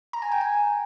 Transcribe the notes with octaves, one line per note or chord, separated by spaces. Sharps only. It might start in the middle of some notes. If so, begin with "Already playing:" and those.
A#5
G#5
G5
G#5